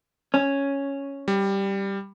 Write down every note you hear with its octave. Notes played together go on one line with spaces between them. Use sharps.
C#4
G3